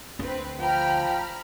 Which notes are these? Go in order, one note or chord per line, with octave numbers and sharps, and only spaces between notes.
D2 D3 C4 B4
F3 G5 A#5 B5 F6